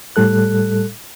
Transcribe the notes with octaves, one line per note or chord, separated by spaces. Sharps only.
A2 G3 A4 F#6